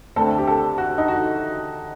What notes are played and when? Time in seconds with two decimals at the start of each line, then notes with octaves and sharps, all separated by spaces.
0.16 D2 D3 A3 C4 A4
0.38 G4
0.47 A4
0.78 F#4
0.98 D#4
1.08 F#4